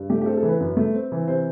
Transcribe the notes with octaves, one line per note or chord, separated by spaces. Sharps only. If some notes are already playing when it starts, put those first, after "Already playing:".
Already playing: G2
A3 G4
G4
C4 A4
A4
E3
B4
F#2
A3
C4
E3
C3 C5